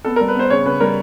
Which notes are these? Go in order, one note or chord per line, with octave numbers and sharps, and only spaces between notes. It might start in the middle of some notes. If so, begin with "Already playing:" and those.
B3 A4
G3 A#4
B4
B3 C5
C#3 C#5
C#3 B4
G3 A#4